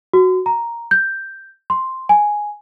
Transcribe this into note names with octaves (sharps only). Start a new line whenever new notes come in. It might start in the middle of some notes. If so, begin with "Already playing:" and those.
F#4
A#5
G6
C6
G#5